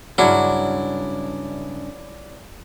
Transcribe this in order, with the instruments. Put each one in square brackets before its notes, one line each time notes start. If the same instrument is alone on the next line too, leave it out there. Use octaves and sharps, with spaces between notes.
[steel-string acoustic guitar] G2 C#3 [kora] F#3 C#4 [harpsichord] D4 E4